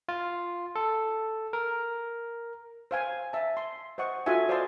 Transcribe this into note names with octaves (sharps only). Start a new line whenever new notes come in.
F4
A4
A#4
C5 F5 G#5
E5 A5
C6
C5 D#5 F#5 C#6
F4 F#4 A4 E5 G#5
C5 D5 D#5 F5 A5 C6